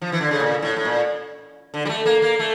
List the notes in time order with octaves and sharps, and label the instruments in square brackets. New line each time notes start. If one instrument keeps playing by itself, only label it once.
[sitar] F3
E3
D3
C#3
A#2
A2
A2
A#2
D3
G3
A3
A#3
A#3
A3